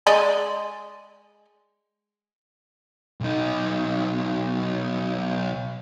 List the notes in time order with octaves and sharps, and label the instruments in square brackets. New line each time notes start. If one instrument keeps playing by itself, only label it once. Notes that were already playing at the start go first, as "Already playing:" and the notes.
[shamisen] G#3 D5 D#5
[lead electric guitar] B1 D#4